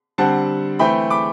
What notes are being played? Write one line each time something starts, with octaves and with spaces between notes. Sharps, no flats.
D3 G3 C4 F#5 A5
E3 A3 C4 G5 B5
B5 D6